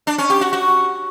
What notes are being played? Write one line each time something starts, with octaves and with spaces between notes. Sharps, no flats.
D4
C#4
G4
F#4
F#4